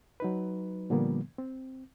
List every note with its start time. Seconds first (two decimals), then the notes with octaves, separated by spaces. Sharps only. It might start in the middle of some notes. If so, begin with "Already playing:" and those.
0.20 F#3 D#4 B4
0.90 A#2 D3 F3 G3 A#3 B3
1.38 C4